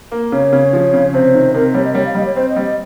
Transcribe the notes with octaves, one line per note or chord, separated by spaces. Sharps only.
A#3
C#3 C#5
C#3
F3
C#3
C3 C5
D#3
C3 A#4
G3 C#5
D#5
G3 C#5
F5
G3 D#5
C#5
C4 C5
D#5
G3
D#5